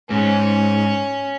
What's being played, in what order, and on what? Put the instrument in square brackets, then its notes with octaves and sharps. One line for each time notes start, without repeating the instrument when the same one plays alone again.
[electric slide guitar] G#2 [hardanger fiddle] C#4